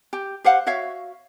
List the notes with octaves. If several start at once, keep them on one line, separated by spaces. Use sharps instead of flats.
G4
G4 C5 F5 F#5
F#4 C#5 E5 F5